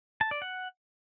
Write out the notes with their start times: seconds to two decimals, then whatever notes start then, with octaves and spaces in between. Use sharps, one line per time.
0.21 A5
0.31 D5
0.42 F#5